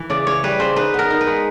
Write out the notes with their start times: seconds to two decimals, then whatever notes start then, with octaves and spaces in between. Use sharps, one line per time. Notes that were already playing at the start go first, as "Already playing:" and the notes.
Already playing: E3
0.10 C#3 D5
0.27 C#3 C#5
0.43 G3 B4
0.59 C#3 C5
0.76 D#4 B4
0.94 B3 A#4
1.10 D#4
1.21 B4
1.27 G#3